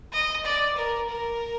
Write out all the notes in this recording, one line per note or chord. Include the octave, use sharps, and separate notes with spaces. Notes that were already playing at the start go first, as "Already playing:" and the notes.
D#5
D5
A#4
A#4